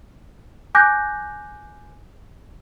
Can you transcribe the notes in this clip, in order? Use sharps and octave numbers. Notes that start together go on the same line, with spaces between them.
G#5 D6 F#6 G6 A#6